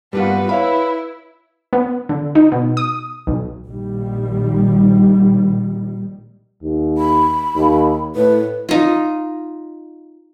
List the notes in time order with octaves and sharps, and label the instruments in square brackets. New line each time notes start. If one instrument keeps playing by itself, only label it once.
[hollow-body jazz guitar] G2 A#3 F4 [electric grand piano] G3 B3 [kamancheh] F#4 B4
[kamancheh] E4 [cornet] B4 [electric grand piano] C#5 E5 B5 [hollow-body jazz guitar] F5
[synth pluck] B3
D3
D#4
B2
D#6
B1
[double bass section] A#1 D#3 G3
[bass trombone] D#2
[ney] B5
[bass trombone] D#2
[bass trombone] A2 [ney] B4
[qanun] D#4 F4